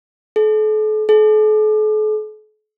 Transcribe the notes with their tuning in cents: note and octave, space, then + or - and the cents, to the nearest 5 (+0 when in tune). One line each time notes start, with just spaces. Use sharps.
A4 -40
A4 -45